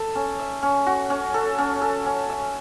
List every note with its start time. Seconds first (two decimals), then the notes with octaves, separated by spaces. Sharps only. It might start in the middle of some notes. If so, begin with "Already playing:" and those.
Already playing: A4
0.15 C#4
0.39 E5
0.63 C#4
0.86 F#4
1.10 C#4
1.34 A4
1.58 C#4
1.82 A4
2.06 C#4
2.30 E5